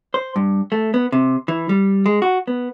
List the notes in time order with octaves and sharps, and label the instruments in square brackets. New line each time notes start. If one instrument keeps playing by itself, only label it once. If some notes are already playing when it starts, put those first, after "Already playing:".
[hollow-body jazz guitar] C5
G2
A3
B3
C3
E3
G3
G#3
F#4
B3